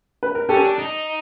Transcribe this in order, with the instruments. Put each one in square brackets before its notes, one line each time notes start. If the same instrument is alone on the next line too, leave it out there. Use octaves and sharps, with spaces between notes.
[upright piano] B4
A#4
[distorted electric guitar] C#4 [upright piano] G4 A4
[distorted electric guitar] D4
D#4